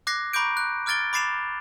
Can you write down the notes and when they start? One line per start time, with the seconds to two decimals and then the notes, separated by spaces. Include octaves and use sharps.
0.07 D6 F#6 G#6 A#6 C7
0.33 A#5 B5 C#6 D6 G6 D7
0.57 F#6
0.86 D6 F6 G#6 A6 D7 G7
1.13 B5 D6 A6 C7 E7 F7